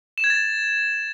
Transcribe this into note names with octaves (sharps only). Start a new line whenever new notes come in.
E7
G#6
A6